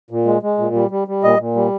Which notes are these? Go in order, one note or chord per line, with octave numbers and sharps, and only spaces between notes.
A#2
G#3
G#3
A#2
G3
G3
G3
A#2 D#5
A#2
G3